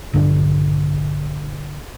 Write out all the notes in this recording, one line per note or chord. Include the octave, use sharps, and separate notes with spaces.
A#1 G2 D3 D4